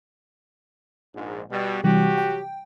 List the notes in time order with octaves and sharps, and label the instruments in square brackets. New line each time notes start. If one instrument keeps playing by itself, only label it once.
[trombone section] A#1 G#2
B2 G3
[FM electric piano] C3 E3 G3 [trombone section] F#3 F#4 G4
[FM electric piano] G5